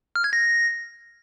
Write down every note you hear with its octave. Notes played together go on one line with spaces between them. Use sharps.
F6
G#6
A#6